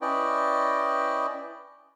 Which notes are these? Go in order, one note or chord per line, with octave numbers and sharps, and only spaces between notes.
C#4 E4 B4 D5 D#5 G5